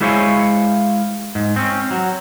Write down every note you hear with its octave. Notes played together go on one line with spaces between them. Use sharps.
G#3 E4 C5 C#5 F5 G#5
G#2
C4 C#4
F#3